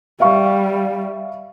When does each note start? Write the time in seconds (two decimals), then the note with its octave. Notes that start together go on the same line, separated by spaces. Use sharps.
0.20 G3 E5 F5 C#6